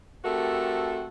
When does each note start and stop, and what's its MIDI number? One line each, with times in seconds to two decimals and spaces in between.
0.25 1.08 57
0.25 1.08 60
0.25 1.08 66
0.25 1.08 67
0.25 1.08 69
0.25 1.08 70